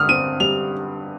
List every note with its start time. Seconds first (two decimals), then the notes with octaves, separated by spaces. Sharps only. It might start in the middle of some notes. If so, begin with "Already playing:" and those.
Already playing: G2 D3 D#6 F6
0.09 C4 D#7
0.40 G3 F7